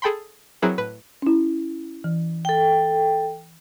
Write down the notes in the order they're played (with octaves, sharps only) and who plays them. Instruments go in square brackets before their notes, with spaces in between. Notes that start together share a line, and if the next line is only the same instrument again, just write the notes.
[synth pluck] G#4 A4 G5 B5 C6
F#3 C4 E4 G#4 A#4 B4
A2 B4
[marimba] C#4 E4
E3
[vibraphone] A4 G5